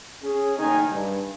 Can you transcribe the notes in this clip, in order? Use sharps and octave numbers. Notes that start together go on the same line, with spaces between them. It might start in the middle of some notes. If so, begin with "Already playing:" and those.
C#4 G#4
F#1 A2 D#3 D#4 G#5
G2